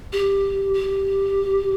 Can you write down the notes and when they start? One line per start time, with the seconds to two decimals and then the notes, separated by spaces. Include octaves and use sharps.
0.13 G4
0.74 G4